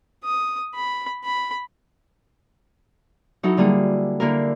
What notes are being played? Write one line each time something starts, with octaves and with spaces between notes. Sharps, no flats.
D#6
B5
B5
F#3 D#4 E4 A4
D3 G3 A#3 G#4
D3 A#3 E4 A#4